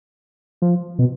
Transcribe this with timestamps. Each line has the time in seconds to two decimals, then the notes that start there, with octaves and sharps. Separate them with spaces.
0.62 F3
0.99 B2